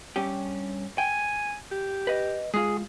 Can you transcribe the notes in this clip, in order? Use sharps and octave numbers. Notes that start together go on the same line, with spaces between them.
G2 C#4 G4
G5 G#5
G4
B4 D#5
G#3 F4 G#4